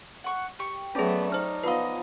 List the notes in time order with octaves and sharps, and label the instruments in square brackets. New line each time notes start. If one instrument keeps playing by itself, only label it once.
[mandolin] F#5 C#6
G4 C#6
[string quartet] F#3 A3 B3 [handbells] C#4 G#4 [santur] C#5 D5 A5
[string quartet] D#4 [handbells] C5 F6 [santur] A5
[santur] F3 B3 D#5 [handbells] B4 F5